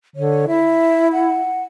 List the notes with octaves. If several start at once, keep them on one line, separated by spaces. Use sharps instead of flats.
D3 C#5
E4 E5
F#5